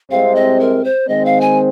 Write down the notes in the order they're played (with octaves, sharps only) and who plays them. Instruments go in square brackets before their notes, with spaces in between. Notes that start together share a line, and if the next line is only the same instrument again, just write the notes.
[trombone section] C2 C3 G#3 C4 [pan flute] F5
[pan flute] D#5
A#4
C5
[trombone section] D#3 G#3 C4 [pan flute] D#5
[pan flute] F5
G#5